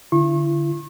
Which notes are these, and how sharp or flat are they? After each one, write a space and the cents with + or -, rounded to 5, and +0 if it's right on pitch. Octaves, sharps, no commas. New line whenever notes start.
D3 -5 E4 +40 C#6 -40